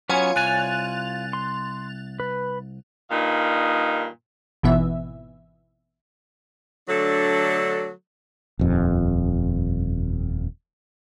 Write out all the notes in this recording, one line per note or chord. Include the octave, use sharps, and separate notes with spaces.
F#3 B3 C#4 F4 C#5 G#5
C2 G#5 F#6 A6 F7
C6
B4
G2 A#2 D#3 D#4 F5
G#1 B2 E3 B3 E5
D3 F#3 A3 D4 A4
D#1 F2